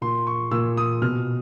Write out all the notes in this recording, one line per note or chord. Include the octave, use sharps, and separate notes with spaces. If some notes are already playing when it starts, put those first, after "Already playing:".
A#2 C6
C#6
A#2 E6
D#6
B2 F6